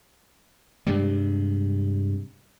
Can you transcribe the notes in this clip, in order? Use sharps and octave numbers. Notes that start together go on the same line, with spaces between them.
G2 C3 G3 G#3